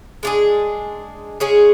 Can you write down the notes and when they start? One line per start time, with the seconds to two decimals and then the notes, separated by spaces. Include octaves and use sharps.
0.23 G#3 D4 G#4
1.40 G#3 C#4 G#4